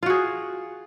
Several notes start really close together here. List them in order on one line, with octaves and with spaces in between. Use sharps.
F4 F#4 G#4